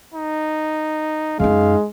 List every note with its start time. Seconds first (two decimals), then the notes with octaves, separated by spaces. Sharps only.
0.14 D#4
1.40 F#2 G#3 D#4 F5